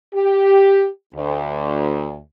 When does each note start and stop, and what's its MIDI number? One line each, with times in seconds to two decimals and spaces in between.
0.14 0.86 67
1.15 2.18 38